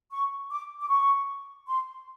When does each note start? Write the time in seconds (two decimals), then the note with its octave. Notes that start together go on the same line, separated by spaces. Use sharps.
0.12 C#6
0.50 D6
0.81 D6
0.89 C#6
1.67 C6